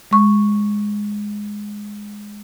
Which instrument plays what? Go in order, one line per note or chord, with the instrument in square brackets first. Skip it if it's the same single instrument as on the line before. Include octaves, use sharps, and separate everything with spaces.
[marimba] G#3 C#6